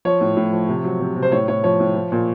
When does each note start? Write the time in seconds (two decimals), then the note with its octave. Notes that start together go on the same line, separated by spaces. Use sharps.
0.05 F3 C#5
0.21 A2
0.37 A2
0.52 F3
0.69 C3
0.84 F#3
1.01 C3
1.16 C3
1.22 C5
1.32 A2 C#5
1.48 A2 C#5
1.64 F3 C#5
1.80 A2
1.95 F3
2.12 A#2